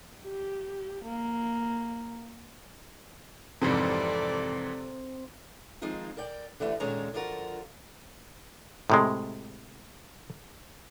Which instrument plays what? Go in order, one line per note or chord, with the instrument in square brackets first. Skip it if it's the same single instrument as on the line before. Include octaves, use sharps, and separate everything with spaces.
[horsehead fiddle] G4
A#3
[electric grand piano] F2 G#2 E3 [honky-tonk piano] C3 [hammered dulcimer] C4 [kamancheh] A4 D5
[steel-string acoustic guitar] D#3 F3 G#3 C4 D#4 F4
A#4 D5 G5
D3 E3 G3 A3
A#2 D3 D#3 G#3 C#4 A#5
D3 F3 F4 F#4 A#4
[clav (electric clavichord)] A2 C3 G#3